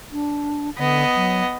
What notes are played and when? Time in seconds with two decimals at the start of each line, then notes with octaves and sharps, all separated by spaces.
0.12 D4
0.78 D3 B3 D#5
1.16 F#3